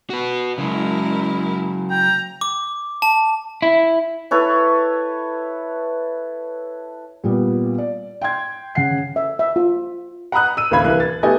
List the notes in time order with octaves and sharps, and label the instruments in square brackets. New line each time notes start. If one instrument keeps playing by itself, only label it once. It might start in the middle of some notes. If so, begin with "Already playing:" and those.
[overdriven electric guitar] F#4 B4
[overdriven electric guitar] C#3 F#3 [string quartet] G#3 E4 A#4
[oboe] G5 [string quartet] A#5
[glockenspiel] D6
A5
[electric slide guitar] E4
[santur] E4 A4 B4 C#5
[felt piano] A#2 G3 B3
D5
G5 C6 G#6
C#3 F#5 C7
[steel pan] E5
E5
F4
[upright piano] F#5 A#5 B5 D#6 F#6
E6 D#7
A1 D2 A#3 F5 B5 G#6
C2 E3 F#6
A6
A3 B3 D#4 G4 D#5 G#5